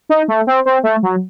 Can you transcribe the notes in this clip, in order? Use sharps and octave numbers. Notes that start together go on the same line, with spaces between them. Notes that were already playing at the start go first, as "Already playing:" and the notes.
D#4
A3
C4
C4
A3
F#3